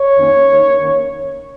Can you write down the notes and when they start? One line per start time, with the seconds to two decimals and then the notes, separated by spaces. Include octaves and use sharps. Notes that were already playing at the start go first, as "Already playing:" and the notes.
Already playing: C#5
0.17 F2 D#3 A#3 C#4
0.47 D#3 A#3 D#4
0.78 D#3 A#3 C#4